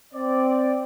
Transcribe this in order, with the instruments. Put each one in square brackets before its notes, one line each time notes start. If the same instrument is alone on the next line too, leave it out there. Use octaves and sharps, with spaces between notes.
[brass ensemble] C4 D5